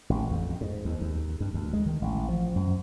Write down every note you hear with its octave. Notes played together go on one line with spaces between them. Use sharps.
A1
F2
G#2
D#2
D#2
G2
D2
G#3
D#3
A1
F3
F#2